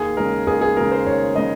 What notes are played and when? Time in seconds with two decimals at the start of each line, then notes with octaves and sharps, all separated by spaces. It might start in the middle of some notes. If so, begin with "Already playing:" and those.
Already playing: D#2 G#4
0.17 C#3 G#3 A#4
0.47 D#2 G#4
0.61 G#4
0.76 C#3 G#3 A#4
0.92 C5
1.06 D#2 C#5
1.35 C#3 G#3 D#5